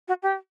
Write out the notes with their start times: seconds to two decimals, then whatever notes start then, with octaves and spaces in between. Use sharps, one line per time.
0.08 F#4
0.23 G4